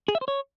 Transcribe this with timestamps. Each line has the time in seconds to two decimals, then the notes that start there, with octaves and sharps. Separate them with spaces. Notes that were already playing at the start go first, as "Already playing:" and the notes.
0.08 G#4
0.15 E5
0.21 C5
0.28 C#5